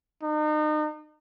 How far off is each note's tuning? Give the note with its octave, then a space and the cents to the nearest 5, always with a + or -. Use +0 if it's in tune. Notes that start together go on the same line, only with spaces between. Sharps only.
D#4 -35